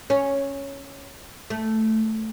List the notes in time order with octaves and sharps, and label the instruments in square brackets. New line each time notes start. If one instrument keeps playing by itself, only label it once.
[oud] C#4
A3